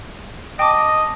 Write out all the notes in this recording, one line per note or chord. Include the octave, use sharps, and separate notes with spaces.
D#5 G5 A5 D6